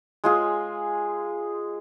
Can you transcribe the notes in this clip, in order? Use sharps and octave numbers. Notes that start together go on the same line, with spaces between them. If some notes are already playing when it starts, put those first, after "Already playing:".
G#3 F4 G#4